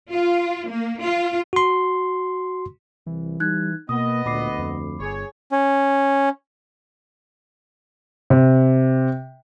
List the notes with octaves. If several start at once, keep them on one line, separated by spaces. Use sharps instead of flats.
F4
A#3
F4
F#4 C6
C2 E3
G3 D#4 F#6 G#6
B2 A#3 B3 D#5 D#6
D2 A#2 B5 D6 C7
F2
G1 G#4 C#5
C#4
C3